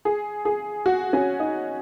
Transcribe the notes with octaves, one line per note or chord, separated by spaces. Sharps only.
G#4
G#4
F#4
C#4
D#4